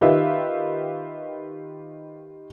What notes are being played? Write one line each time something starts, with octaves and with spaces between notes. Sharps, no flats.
D#3 D#4 F4 G4 B4 E5